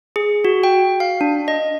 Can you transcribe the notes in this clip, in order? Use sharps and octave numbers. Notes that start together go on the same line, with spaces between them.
G#4
F#4
G5
F5
D4
D#5